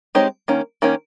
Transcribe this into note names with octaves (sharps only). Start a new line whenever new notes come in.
G#3 C4 D#4 G4 C#5
D#3 A#3 C#4
D#3 A#3 C#4